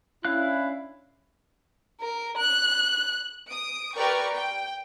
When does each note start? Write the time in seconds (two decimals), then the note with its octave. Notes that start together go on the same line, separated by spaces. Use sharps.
0.25 C#4 D4 E4 F5 F#6
2.01 A#4
2.38 F#6
3.50 D#6 D7
3.95 G4 A#4 B4 D5 G5 C#6
4.34 G5